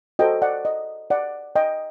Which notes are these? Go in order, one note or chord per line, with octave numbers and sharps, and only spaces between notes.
F#4 A4 C5 D#5 G5
D5 F#5
D#5
D5 F#5
D#5 G5